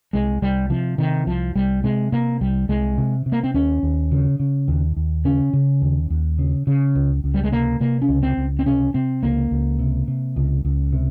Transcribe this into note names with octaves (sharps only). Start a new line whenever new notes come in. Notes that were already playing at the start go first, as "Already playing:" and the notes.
C2 G#3
C2 G3
C3 F3
C3 D#3
C2 F3
C2 G3
C3 G#3
C3 A#3
C2 G3
C2 G#3
C3
C3
A#3
C4
D#2 C#4
D#2
C#3
C#3
D#2
D#2
C#3 C#4
C#3
D#2
D#2
C#3
C#3
C#2
C#2
G3
G#3
C3 A#3
C3 A#3
C#4
C#2
C4
C#2
C4
C3 C#4
C3 C4
C#2 A#3
C#2
C3
C3
C#2
C#2
C3